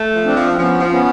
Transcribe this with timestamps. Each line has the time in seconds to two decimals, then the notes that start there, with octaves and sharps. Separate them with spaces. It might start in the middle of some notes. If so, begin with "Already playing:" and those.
Already playing: A3
0.15 F3
0.25 C4 D4
0.36 F3
0.51 C4
0.58 F3 B3 C#4
0.80 F3
0.91 B3 C#4